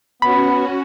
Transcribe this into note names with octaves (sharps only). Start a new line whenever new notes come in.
B3 C#4 F#4 B5